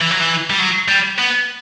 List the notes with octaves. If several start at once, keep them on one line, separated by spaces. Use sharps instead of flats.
E3
F#3
E3
G3
F#3
G3
B3